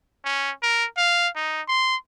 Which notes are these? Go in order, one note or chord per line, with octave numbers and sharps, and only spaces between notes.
C#4
A#4
F5
D#4
C6